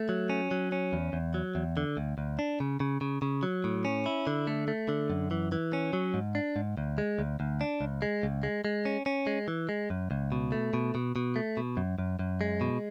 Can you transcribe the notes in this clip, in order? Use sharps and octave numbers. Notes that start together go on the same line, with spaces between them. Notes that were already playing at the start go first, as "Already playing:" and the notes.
Already playing: A3
F#3
C#4
F#3
C#4
E2
E2
F#3
E2
D3
D2
D2
D4
C#3
C#3
C#3
C#3
F#3
A2
C#4
E4
D3
A3
A3
D3
F#2
E3
E3
C#4
F#3
G#2
D4
G#2
D2
G#3
D2
D2
D4
C#2
G#3
C#2
G#3
G#3
C#4
C#4
G#3
E3
G#3
F#2
C#2
B2
A3
B2
B2
B2
A3
B2
F#2
F#2
F#2
G#3
B2